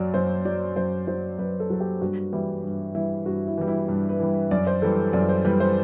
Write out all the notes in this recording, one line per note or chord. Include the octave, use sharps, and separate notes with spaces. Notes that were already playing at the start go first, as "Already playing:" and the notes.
Already playing: F#2 F#3 D5
F#2 C5
F#3 D5
F#2 C5
F#3 C5
F#2 B4
A4
F#3 A4
G4
G2 F#4
E3 G3 E4
G2
E3 G3 E4
G2 F#4
E4
E3 G3
E4
G2 D4
B4
E3 G3
F#2 D5
C5
E3 G3 A4
F#2 D5
C5
E3 G3 B4
C5